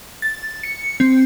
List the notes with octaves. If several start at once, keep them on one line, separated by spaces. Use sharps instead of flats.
A6
C#7
C4